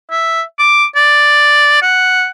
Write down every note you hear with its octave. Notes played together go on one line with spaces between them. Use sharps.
E5
D6
D5
F#5